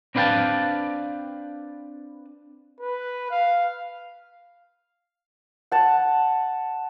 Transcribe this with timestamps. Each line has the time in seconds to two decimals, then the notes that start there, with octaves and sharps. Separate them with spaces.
0.15 C4 D4 B4 F5 G5 A5
2.80 B4
3.31 F5
5.72 F#5 A5